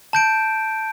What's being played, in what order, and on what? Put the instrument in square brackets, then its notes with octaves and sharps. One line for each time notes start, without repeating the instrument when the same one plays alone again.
[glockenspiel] A5 G6 D7